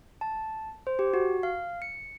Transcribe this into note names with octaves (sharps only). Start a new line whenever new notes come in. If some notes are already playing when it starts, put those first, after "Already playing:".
A5
C5
G4
F#4
F5
C#7